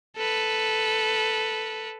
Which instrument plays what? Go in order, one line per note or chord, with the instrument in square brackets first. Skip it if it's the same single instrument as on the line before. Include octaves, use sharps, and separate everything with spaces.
[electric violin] A4 B4